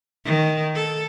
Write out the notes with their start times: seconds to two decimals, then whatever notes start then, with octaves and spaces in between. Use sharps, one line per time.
0.25 D#3
0.75 A4